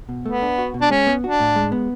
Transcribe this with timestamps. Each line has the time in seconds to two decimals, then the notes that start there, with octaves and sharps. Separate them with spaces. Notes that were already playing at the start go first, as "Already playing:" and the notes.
0.09 B2
0.26 A3 B3
0.42 D4
0.58 F#4
0.74 B2
0.81 D4
0.90 G#3 C#4
1.07 B3
1.23 D4 F#4
1.40 A2
1.56 G#3
1.72 B3